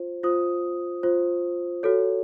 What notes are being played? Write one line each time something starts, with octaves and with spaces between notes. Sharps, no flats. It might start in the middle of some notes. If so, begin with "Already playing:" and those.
Already playing: F4 C5
F4 C5 D#6
F4 C5
F#4 A4 C#5